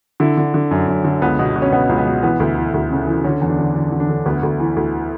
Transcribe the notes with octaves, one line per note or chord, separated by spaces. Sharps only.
D3 E4
D3
D3
F#2
F#2
D3
C#2 B3
B2
B2
C#4
B2 B3
C#2
B3
B2
E3 B3
D2
E3
D2
C#3
E3
D3 C#4
E2
D4
D3
D3
D3
D4
D3
D2 B3
D2
E3
D2